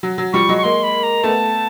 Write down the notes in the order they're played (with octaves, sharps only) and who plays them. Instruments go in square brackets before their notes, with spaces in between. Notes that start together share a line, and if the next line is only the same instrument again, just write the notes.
[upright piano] F#3
F#3
[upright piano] F3 G3 [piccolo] C#6
[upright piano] F#3 G#3
[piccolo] C#6
[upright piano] G#3 A#3 [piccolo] C6
[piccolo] B5
A#5
[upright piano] A3 B3 [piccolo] A5